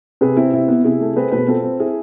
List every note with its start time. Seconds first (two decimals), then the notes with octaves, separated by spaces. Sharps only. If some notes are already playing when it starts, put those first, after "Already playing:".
0.21 C3 G#4 B4
0.37 C4 E4
0.53 C3 E4
0.68 B3
0.84 C3 E4 G#4
1.00 A3
1.16 C4 G#4 B4
1.31 B2 G#4 B4
1.47 C4 F4 A4
1.64 C4
1.80 E4 G#4